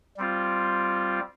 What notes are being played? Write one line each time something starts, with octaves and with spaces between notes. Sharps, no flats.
G3 C4 F4